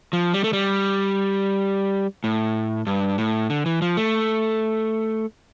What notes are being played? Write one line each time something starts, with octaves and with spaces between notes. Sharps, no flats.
F3
G3
A3
G3
A2
G2
A2
D3
E3
F3
A3